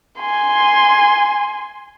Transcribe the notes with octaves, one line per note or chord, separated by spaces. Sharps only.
G#5 C6